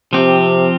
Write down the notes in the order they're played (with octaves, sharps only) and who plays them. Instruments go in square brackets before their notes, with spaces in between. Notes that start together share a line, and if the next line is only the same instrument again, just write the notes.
[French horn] C3 [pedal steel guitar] F3 C4 G4